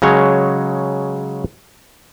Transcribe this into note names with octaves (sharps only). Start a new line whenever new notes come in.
C#3 F#3 G#3 C#5